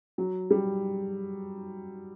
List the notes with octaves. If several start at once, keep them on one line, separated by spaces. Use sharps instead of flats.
F#3
G3